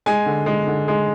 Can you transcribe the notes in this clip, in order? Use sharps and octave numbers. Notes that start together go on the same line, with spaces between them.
G#3 G#5
D3
G#3
D3
G#3